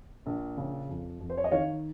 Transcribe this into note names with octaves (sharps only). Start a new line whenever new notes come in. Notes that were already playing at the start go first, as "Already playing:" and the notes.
A#1
C#3
F2
F2
C5
C#5
D#5
D#3 C#5 F5